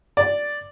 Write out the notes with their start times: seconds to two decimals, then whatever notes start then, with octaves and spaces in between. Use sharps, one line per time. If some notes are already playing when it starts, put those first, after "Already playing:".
0.17 D5